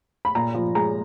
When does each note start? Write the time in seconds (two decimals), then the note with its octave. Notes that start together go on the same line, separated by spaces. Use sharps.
0.25 B5
0.35 A#2 A#5
0.55 F3
0.75 G#3 A#5